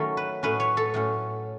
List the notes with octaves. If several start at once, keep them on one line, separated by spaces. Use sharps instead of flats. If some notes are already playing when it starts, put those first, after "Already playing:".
Already playing: D#3 F#3 A3 C#4 A4
B4
A2 F#3 C#4 B4
C#5
A4
A2 F#3 C#4